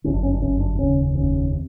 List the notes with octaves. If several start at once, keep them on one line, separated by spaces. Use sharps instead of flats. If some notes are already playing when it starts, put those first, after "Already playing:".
G1 F#2 D3 C#4
D4
C#4
D4
G1 F#2 D3 C#4
D4
F1 D#2 C#3 C#4
F1 D#2 C#3 C#4
C3